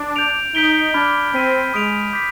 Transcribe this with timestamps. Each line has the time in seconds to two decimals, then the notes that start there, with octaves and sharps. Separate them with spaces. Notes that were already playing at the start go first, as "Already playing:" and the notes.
Already playing: D4
0.16 G6 D7 F7
0.55 D#4 G6 B6 D7 G7
0.94 D4 B5 F6 G#6
1.34 C4 F6 B6 D#7
1.73 G#3 C6 D#6 B6 D7 F7
2.13 D6 G6 B6